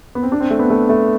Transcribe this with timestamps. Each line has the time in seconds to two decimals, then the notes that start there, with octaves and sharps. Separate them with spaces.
0.15 B3
0.23 C4
0.32 D4
0.40 C4
0.51 A3
0.59 B3
0.70 A3
0.89 A3